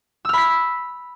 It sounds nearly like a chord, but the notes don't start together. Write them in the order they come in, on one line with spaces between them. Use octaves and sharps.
E6 F6 B5 B6